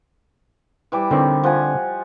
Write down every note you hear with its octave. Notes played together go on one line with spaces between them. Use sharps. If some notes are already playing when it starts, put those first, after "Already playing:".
E3 G3 D6
D3 D#3 C4
F3 F#5 G#5